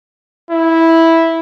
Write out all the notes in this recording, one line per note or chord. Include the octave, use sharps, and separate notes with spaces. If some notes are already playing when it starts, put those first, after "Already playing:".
E4